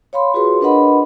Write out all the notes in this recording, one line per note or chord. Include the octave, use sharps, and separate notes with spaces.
C#5 F5 B5 C6
F4 F#4 G#4 B4 C#5 C6
D4 A#4 B4 D#5 F#5 B5